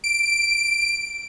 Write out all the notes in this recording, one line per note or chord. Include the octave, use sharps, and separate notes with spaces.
D7